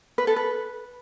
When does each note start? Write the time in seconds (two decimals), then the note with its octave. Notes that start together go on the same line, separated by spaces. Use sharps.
0.18 B4
0.27 A4
0.36 B4